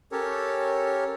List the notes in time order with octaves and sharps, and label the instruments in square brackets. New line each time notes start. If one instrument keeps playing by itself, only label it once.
[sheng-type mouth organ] C#4 G4 A4 A#4 C#5